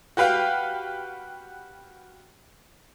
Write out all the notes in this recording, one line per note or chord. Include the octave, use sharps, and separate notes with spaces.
F#4 G4 B4 F5 G5